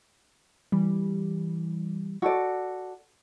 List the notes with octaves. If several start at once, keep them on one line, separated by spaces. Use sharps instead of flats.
E3 G3
F#4 A4 D5